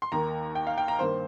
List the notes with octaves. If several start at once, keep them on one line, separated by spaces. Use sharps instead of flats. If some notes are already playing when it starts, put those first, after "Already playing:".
C6
D#2 D#3 A#3 A#5
G5
F5
G5
A#5
G2 D#3 A#3 C5